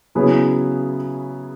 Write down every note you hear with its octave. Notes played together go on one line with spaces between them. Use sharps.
C#3 F#3 B3 E4 G#4